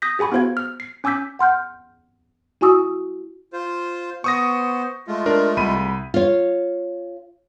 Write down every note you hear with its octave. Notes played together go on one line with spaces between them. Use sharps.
D#6 G6 A#6 B6
G4 G#4 G#5 B5 C#6
B3 E4 F#4 C5 F5 G#6
F6
C7
C#4 G#5 D6 E6 G6 B6
F#5 C6 F6 G6
E4 F#4 G#5 C#6 D#6 E6
F4 C5
B3 C5 C#6 D#6 A#6
G#3 A3 F4
D4 A#4
C2 B5 D#7
F4 C#5